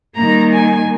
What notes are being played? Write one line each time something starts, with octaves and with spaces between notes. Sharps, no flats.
D#3 G3 A#3 A#5
G#5